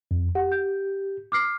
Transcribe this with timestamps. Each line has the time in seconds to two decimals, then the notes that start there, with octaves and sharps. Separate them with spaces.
0.11 F2
0.35 G4 F#5
0.52 G6
1.32 D6 F6 C7